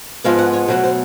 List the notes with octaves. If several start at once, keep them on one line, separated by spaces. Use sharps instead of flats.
G#2 F3 G#3 B3 F5
F#5
C#5
B2 F#3 A3 C5
C5